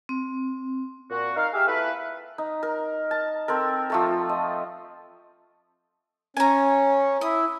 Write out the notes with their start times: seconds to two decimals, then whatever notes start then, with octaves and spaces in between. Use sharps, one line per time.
0.09 C4
1.10 A#2 F#4
1.36 D#4 A#4 F5
1.54 G4 G#4 E5 F5
1.67 A3 B3 E4 F4 A4 B4
2.38 D#4
2.63 A#4
3.11 A5
3.48 C4 A4 A#4
3.90 F3 A3 A4
4.29 D#5
6.37 C#4 G#5 A#5
7.21 E4 D#6